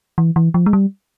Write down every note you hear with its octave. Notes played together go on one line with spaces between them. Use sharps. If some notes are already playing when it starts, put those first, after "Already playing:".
E3
E3
F3
G#3
G3